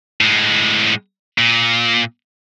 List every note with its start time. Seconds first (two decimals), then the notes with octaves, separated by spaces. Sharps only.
0.21 A2 G#3
1.38 A#2